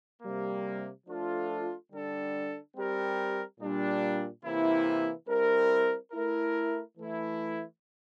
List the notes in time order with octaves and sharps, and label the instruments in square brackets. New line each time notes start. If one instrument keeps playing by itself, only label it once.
[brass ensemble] C3 G3 A#3
F3 A3 D4 F4 A4
D3 G3 D4 A4
G3 C4 G4 A#4
A#2 G3 D4
C3 E3 A#3 E4
G3 C4 E4 A#4
A3 E4 A#4
E3 A3 E4